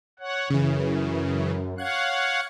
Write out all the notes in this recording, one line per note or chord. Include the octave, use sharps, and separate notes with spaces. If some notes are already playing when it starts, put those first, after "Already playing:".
C#5 F#5
F#2 C#3 E3
C#5 F5 F#5 F#6 G#6